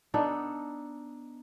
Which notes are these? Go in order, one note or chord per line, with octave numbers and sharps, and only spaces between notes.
B3 D4 D#4 A4